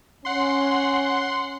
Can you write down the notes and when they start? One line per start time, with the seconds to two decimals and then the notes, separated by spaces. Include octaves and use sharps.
0.25 C#4 F#5 C6